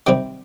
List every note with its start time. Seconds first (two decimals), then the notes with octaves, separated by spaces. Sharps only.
0.07 C3 D#3 G3 C4 G5